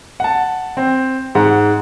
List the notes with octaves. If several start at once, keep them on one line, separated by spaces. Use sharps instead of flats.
F#5 A5
C4
G#2 F#5